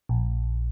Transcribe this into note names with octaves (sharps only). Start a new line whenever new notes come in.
A#1